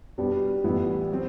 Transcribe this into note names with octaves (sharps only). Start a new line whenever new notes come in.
B2 G3 B3 D4 G4
A2 E3 G3 B3 E4
F#3 C4